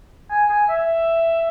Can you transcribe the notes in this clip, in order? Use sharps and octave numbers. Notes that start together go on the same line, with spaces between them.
G#5
G#5
E5